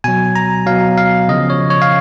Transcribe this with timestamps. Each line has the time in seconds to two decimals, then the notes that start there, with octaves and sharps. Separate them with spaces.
0.04 B2 F#3 G#5
0.36 A#5
0.66 B2 F#3 F5
0.98 F5
1.28 C#3 F3 D#5
1.50 C#5
1.70 C#5
1.82 F5